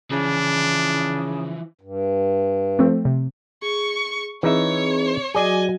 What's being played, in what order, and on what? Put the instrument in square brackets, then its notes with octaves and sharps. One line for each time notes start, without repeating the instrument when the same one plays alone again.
[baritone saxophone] C#3 [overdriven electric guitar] E3 F3 [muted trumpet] D4
[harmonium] G2
[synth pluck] F3 A3 C4
C3
[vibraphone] G#4 [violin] C#6
[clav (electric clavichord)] E3 D#4 E5 [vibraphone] C4 G#4 [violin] C#5
[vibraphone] F#3 F#4 [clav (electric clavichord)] G#4 D5 [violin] D#5 G#5